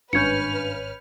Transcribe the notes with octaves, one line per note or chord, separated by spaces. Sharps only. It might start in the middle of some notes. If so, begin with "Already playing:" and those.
G#1 G2 C#4 B4 F6 G6 G#6 C#7